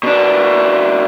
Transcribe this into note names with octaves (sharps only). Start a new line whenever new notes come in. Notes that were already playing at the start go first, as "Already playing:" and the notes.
B2 D4